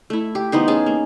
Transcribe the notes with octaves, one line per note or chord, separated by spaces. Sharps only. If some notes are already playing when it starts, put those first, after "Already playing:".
A3 E4
G4
E3 B3 D#4 C5
C#4 G#4 A5
A#3